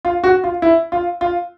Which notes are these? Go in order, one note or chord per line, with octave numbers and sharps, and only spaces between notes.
F4
F#4
F4
E4
F4
F4